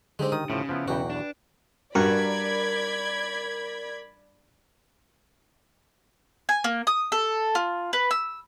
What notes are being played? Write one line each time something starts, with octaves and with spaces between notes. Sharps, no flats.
D3 G#3 C4 D#4 G4
D#3 D#6
A2 C#3 F3
F3 B3 E4
B1 E2 F#4 B4 G5
D4
G2 F#4 A#4 D5 B5 G#6
G#5
A#3
D#6
A4
F4
B4
E6